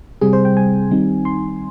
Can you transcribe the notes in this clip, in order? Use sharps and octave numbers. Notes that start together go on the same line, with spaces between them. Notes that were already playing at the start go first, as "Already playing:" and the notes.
C3 G3 C4 G#4
C5
G5
G#5
D#3 G3 C4 D#4
C6